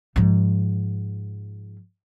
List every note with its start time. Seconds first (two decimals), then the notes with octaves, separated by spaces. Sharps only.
0.16 G#2 F3